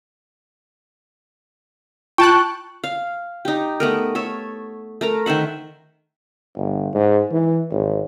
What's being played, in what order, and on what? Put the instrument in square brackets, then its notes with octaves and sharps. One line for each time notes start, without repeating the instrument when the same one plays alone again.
[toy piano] F4 [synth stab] G5 A5 F#6 [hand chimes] C#6
[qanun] F5
D#4 G4
A3 B3 A#4
A4 C#5 E5
A3 A#4 A#5
D#3 C5 E5 F#5
[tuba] G1
G#2
E3
G#1